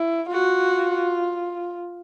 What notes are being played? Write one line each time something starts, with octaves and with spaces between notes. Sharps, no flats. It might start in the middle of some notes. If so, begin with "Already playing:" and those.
Already playing: E4
F4 F#4